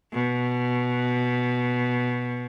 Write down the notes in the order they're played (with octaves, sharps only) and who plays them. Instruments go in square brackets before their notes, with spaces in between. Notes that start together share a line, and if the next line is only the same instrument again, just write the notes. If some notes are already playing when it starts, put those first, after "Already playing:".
[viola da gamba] B2